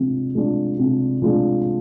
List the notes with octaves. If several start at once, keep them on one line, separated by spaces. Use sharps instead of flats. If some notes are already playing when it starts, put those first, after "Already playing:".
Already playing: C3 F3 G#3 D4
F3 G#3 D4
C3
F3 G#3 D4